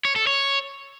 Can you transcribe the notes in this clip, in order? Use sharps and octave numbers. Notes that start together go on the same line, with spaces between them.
C#5
A4
C#5